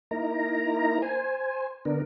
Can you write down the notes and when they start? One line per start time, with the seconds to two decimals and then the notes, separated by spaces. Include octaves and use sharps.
0.11 A#3 D#4 E4 A#4 A#5
1.02 C5 G#5
1.85 D3 B3 D4 A#4